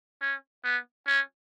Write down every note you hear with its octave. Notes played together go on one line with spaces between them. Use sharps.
C#4
B3
C#4